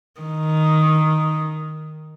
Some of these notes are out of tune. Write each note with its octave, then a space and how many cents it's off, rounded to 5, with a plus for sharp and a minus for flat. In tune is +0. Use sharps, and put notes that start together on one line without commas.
D#3 +0